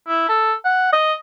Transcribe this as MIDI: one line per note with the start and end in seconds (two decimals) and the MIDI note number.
0.08 0.29 64
0.29 0.53 69
0.65 0.92 78
0.93 1.14 75